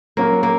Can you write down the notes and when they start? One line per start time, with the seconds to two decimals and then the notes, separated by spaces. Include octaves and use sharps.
0.17 F#3 A#3 C#4 F4 A#4
0.43 A#3